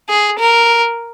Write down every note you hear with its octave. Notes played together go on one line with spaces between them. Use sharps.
G#4
A#4